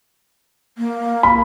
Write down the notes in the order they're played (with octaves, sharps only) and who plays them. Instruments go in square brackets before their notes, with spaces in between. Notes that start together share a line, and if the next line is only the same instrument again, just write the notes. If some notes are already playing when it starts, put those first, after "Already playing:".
[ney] A#3
[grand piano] B5